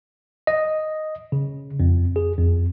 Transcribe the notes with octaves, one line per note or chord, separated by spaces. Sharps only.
D#5
C#3
F2
G#4
F2